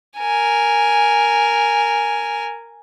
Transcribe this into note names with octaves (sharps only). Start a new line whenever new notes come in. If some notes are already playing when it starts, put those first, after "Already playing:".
A#4 G#5